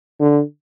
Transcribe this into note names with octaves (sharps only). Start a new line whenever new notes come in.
D3